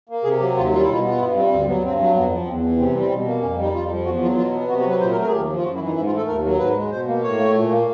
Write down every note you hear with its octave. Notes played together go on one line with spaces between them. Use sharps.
A#3
C3 G#4
F#3 G4
D#2 F4
G3 F4
E4
B2 F4
B3
F4
G2 E4
G3 C4
D2 C4
F#3 B3
G2 C4
F#3
F2 B3
F3
E2 C4
E3
C3 C4
C4
G3
C4
B2
A#3
F2 C#4
G3
D#4
F2 F4
F3
E2 F#4
F#3 F4
B2 F4
B3
C3 F#4
F#4
F#3 B4
A#2 C5
A#4
A3
A#4
G#4
D#2 G4
F3
F4
F#2 F#4
E4
E3
D#4
G#2 E4
F4
A3 A4
D#2 A#4
F#3
G#2 B4
G#3
B2 C5
A#3
A2 C#5
A3
A#2
A#3